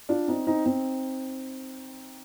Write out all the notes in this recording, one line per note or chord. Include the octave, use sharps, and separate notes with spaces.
D4 F4
C4 D#4
C4 D#4
C4 D#4